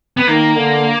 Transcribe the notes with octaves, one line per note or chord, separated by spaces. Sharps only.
B3
D#3 A#3
D3